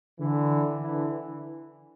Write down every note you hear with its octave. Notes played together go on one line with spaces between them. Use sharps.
D3 E3
D3 E3